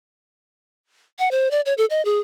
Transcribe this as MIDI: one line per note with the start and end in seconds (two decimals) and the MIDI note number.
1.19 1.29 78
1.31 1.51 72
1.51 1.61 74
1.66 1.74 73
1.78 1.85 69
1.90 2.03 75
2.05 2.20 68